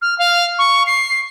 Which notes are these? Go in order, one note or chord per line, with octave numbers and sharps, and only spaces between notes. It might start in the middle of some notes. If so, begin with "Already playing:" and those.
F6
F5
C#6
C7